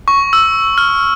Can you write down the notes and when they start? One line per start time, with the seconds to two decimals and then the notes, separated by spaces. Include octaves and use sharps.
0.08 C#6
0.33 E6
0.78 F6